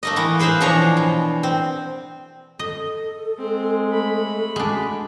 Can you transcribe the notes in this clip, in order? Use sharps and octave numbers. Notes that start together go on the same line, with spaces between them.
A3 A#3 D#5
E3 A#3 B3
G#4 B4 C5 E5 F5
B2 E3 F3 D4 C#5 A#5
B2
C4
A4 D#5
G#3 C4
A3 B5
G#3 D4 F#4